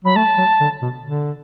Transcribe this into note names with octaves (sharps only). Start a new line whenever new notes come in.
F#3 B5
A3 A5
F#3
D3
B2
D3